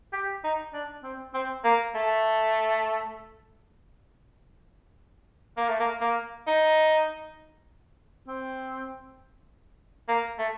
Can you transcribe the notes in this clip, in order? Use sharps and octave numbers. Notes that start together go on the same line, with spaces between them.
G4
D#4
D4
C4
C4
A#3
A3
A#3
A3
A#3
A#3
D#4
C4
A#3
A3